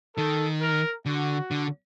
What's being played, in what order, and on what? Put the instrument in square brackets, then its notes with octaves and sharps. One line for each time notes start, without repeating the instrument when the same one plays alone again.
[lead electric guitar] D#3 [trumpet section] A4
[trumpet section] A#4
[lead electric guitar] D3 [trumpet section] F#4
[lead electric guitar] D3